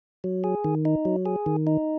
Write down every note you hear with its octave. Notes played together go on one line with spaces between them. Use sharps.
F#3
G#4
D#3
D#4
F#3
G#4
D#3
D#4